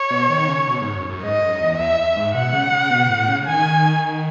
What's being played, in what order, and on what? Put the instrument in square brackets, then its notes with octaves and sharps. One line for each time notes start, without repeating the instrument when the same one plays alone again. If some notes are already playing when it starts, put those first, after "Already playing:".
Already playing: [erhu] C#5
[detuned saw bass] B2
D#3
C#3
B2
G#2
F#2
F#2
[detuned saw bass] G#2 [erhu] D#5
[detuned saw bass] F#2
E2
[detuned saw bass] E2 [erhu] E5
[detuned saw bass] G#2
[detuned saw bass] B2 [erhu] F#5
[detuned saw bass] C#3
C#3
B2
A2
C#3
[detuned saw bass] D#3 [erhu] G#5